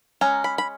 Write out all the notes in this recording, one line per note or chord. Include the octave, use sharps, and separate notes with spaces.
G#3 C#4 A#5
B5
B5